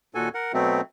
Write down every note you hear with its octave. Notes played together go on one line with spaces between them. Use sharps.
D#2 A#2 F#4 A4 G#5
A#4 F#5
B2 F#3 A3 B3 C4